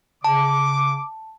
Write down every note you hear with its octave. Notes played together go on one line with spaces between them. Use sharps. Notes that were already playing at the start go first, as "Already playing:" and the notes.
C#3 A5 D6